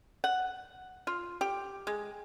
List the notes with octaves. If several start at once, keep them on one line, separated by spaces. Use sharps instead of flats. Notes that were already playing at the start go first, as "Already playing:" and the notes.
F#5
F4
G4
G#3